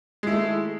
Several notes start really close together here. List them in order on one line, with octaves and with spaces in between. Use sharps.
G#3 E4 A3